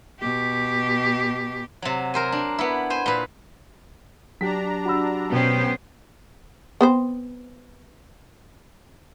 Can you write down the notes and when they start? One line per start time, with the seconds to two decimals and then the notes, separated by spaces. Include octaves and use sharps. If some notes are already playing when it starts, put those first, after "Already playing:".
0.20 B2 G4
1.82 C3 F#3
2.14 A#4 C5 G#5
2.32 D4
2.58 B3 E4
2.90 C5 G#5
3.06 A#2 B4
4.41 F#3 D4 G4 A#5 B6
4.85 F#4 B5 E6
5.32 B2 B3 C#4 C5 G5
6.81 B3 C4 C5